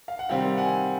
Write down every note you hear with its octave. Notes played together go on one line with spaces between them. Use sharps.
F5
F#5
C3 D#3 G3 C4 F5 G5
F#5 G#5